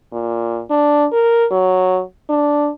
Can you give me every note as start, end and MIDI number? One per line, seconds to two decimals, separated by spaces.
0.13 0.61 46
0.70 1.06 62
1.12 1.46 70
1.51 2.02 54
2.30 2.69 62